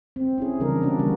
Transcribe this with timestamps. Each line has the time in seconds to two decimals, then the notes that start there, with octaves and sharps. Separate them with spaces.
0.16 C4
0.38 C#4 E4 G#4
0.60 C#3 E3 G3 D4 A#4
0.81 C3 B3 C#4 D4 F#4
0.99 D3 G3 A#3 B3